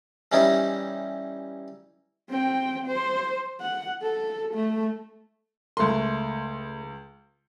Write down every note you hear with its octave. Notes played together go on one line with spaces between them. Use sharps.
E3 G3 C#4 D#4 E4
C4 G5
C5
F#5
A4
A3
C#2 A3 A#4 C6